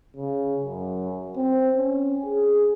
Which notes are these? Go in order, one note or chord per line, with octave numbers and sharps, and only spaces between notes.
C#3
F#2
C4
C#4
G#4